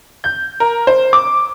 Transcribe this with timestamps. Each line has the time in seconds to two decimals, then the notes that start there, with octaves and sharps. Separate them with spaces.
0.24 G6
0.60 A#4
0.87 C5
1.13 D6